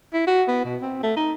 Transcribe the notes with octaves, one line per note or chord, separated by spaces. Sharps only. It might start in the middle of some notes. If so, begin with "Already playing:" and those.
E4
F#4
B3
B2
C4
A3
D#4